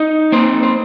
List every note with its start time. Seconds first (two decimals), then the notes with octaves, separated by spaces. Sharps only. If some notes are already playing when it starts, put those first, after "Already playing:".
Already playing: D#4
0.32 A#3 C4 C5
0.63 C5